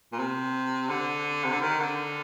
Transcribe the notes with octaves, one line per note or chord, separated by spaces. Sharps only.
A#2
C3
D3
C3
D3
D#3
D3